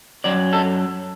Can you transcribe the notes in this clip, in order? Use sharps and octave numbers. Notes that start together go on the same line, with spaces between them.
F#2 F#3 D5
A4